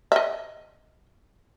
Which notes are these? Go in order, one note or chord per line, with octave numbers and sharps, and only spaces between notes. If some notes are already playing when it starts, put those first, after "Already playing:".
D#5 E5